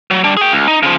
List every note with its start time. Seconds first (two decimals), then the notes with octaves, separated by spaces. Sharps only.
0.11 F#3
0.24 G3 D4
0.37 G#4 G5
0.52 C#2
0.68 D#4
0.83 C#3 F3